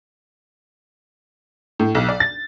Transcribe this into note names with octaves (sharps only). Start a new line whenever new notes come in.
A2
B1
D5
A6